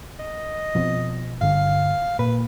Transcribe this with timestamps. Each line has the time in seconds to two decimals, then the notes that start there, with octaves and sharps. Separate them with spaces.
0.19 D#5
0.75 B2 F3 C4
1.41 G1 D3 F5
2.19 A#2 B4